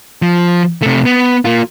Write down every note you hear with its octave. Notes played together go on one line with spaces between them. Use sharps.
F3
C3 A3
B3
A#3 F4